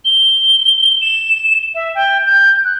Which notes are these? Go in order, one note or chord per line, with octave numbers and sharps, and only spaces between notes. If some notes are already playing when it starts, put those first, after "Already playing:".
G7
E7
E5
G5
G6
F#6